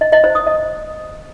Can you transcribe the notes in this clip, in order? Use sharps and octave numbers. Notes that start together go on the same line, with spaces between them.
D#5
D#5
C5
D#6
D#5